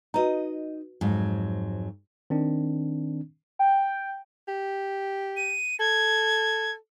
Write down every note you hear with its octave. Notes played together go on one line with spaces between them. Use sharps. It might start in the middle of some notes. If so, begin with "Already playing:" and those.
D#4 F#4 B4 D#5 A#5
F2 G#2 F#3
D#3 C4 D4
G5
G4
D#7
A4 G#6